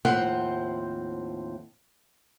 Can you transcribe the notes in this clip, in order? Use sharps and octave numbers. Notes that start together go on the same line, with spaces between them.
D#2 A2 F3 C4 C5 F#5